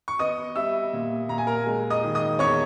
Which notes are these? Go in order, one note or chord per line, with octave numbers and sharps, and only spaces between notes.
C#6
B3 D#5 D#6
G3 E5 E6
A#2
A#2 A#5
G#5
A#4 A#5
G#3
D#5 D#6
D#3
D#5 D#6
E2 C#5 C#6